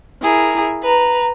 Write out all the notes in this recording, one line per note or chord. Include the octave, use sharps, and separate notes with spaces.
E4 G#4 A#4
B4 A#5